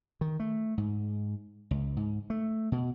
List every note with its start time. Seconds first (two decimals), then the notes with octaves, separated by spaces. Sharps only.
0.21 D#3
0.40 A3
0.78 G#2
1.71 C#2
1.97 G#2
2.30 A3
2.72 B2